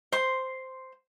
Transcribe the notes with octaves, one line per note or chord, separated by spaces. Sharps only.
C5 C6